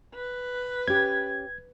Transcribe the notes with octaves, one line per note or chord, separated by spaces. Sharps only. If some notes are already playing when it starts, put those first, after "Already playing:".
B4
C#4 G4 G#6